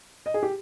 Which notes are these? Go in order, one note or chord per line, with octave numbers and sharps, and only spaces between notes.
D#5
G#4
G4